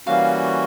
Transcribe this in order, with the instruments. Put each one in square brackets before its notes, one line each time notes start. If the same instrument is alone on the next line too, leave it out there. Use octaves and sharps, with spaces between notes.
[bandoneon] E3 G3 A#3 C#4 F#4 [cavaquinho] F5